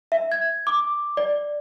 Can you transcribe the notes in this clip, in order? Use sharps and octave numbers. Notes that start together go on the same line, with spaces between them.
E5
G#6
D6
D5